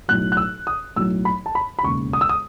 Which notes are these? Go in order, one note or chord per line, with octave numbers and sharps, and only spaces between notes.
B1 A2 F#3 F#6
F#6
E6
D#6
B1 A2 F#3 E6
B5
A5
B5
B5
E1 D#2 C#3 C#6
D#6
E6
D#6